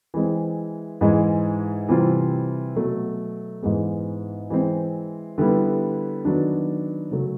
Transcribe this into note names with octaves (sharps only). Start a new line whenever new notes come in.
E3 G#3 C4
G#2 E3 G#3
C3 E3 G3 C4 F4
B2 F#3 A3
G#2 E3 G#3 B3
E3 G#3 C4
D3 G3 B3 E4
D#3 F#3 B3 D4
C#3 F#3 A3